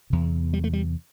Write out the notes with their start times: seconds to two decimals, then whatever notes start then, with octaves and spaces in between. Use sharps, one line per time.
0.10 E2 C3
0.53 G3
0.64 A3
0.73 G3